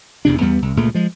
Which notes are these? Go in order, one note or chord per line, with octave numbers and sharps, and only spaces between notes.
E1 E2 C3 D4
E2 G3 B3
C2
C#2 A#2 C#3 A3
F3 G#3